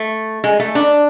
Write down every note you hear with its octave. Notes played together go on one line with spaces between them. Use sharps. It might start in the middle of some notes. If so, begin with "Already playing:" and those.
Already playing: A3
G#3
A3
D4